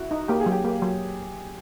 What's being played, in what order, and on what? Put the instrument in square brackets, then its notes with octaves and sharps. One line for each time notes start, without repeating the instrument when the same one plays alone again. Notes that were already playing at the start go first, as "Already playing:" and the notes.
Already playing: [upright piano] E4 F#4
[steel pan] D#4
[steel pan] A#3 [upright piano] G4
[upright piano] G#4
[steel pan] F#3
[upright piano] G4
[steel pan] A#3 [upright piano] G4
[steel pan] F#3